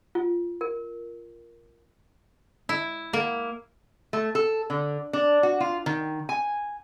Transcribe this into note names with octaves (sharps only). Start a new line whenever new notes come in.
F4
A#4
E4
A#3
A3
A4
D3
D4
F#4
F4
D#3
G#5